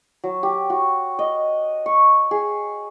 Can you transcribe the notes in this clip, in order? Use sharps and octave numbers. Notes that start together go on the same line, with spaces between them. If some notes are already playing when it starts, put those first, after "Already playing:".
F#3
G4
F#4
D#5
C#6
G#4